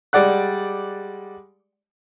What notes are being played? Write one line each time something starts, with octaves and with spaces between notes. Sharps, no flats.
G3 G#3 D5 F#5 F#6